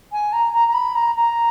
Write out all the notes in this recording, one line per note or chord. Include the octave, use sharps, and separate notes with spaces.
G#5
A#5
A#5
A#5
B5
A#5
A#5